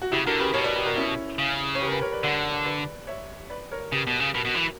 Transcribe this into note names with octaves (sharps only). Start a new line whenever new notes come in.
F#4
C#3 E4 G4
D3 F#4 A#4
C#3 G4 B4
B2 A#4 C#5
B4 D5
G4 B4
F#4 A#4
C#4 E4
C#3
C#5
G4 B4
A#4
G4 B4
A#4 C#5
B4 D5
D3 D5 F#5
B4 D5
C#5 E5
B4 D5
A#4 C#5
C#3 G4 B4
B2
C#3
B2 F#4 A#4
B2
E3